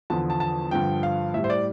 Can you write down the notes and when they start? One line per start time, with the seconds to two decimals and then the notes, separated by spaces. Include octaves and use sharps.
0.10 E2 D3 F3 A5
0.30 A5
0.40 A5
0.71 G2 D3 F3 G5
1.03 F5
1.34 A2 G3 E5
1.44 C5
1.50 D5